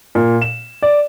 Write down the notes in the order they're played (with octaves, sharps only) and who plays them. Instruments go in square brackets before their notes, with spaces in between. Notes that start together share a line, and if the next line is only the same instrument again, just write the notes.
[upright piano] A#2
E7
D5